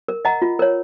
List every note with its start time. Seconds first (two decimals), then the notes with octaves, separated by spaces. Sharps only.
0.08 A#4
0.25 D#5 F#5 A#5
0.42 F4
0.59 A#4 C#5